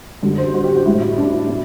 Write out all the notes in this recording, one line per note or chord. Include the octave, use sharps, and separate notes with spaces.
F#2 D3 G3
C5
F#4
G4
F#4
A2 G3 E4
F#4
D4
E4
B2